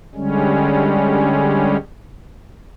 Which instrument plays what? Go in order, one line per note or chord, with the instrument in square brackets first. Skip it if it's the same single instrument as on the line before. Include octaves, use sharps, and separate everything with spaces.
[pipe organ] D3 G3 G#3 C#4